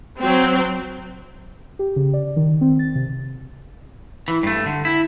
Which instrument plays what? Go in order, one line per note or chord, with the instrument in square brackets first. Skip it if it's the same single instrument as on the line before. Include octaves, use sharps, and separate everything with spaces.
[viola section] F#3 C4
[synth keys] G4
C#3
D5
D#3
C4
A6
C3
[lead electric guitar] E3
G2 A3
D3
E4